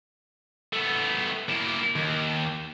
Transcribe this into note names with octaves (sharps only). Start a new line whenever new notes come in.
A3 B3
A#3 E4
D#2